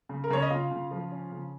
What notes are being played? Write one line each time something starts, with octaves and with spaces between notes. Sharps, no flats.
C#3
A#4
C#3 C#5
D#5
C#3 F4 F5
C#3
F3
C#4
C#3